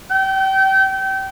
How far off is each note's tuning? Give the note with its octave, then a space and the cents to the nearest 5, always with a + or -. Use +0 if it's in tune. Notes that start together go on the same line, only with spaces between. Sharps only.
G5 -30